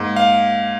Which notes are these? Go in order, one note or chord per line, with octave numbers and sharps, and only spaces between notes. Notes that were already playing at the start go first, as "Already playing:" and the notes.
Already playing: G#2 A#3
F5